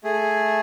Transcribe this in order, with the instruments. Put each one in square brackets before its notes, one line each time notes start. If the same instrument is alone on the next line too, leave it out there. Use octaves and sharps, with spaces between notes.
[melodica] A3 [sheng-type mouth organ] G#4